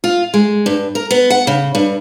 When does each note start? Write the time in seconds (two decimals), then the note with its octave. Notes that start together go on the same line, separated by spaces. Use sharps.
0.04 F4
0.34 G#3
0.66 G2
0.95 A#4
1.11 B3
1.30 F#5
1.47 C#3
1.75 G2